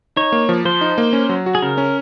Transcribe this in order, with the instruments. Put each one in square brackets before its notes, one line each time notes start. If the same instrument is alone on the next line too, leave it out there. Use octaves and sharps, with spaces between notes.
[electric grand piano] D#4 [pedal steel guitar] C#5
[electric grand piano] A#3
F3
[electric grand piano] F3 [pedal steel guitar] C5
[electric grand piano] D#4
A#3
C#4
F#3
F#4
[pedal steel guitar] G#4
[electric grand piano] C#3 [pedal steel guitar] A#4
[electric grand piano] C#4